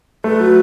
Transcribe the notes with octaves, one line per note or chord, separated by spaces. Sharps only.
A3 B4
F#3